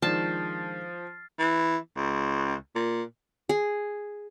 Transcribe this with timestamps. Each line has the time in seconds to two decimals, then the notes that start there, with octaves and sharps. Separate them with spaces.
0.02 D#3 F3 G#3 D4 A5 F6 A6 C7
1.39 E3
1.97 C#2
2.75 A#2
3.49 G#4